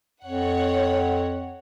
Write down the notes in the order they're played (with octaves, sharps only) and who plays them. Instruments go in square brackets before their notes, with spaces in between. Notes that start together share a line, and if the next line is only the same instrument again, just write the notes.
[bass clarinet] F2 [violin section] C#5 F#5